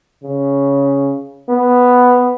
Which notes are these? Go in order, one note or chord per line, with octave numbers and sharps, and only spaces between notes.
C#3
B3